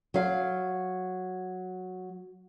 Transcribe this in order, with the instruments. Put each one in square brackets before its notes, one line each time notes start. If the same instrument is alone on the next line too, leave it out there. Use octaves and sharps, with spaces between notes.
[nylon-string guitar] F#3 F5